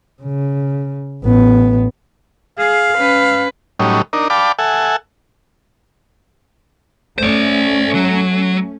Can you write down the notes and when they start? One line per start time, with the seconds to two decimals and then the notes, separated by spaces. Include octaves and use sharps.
0.22 C#3
1.24 A1 B3
2.59 G#4 F5
2.95 C#4 B4
3.80 A2 F#3 G3 C#4 D#4
4.13 D4 D#4 A#4
4.30 D5 F5 G5 A5 B5 D6
4.59 A4 E5 F#5 G#5
7.18 A3 C#4 C5 D5
7.95 F#3